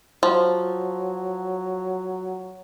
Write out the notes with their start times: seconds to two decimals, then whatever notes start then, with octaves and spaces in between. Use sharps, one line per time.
0.23 F3 F#3